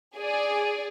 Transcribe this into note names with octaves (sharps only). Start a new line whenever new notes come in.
G#4 D5